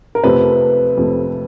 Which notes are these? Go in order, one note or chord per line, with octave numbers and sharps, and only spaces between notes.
A#4
F2 C3 F3 A3 B4
F2 C3 F3 A3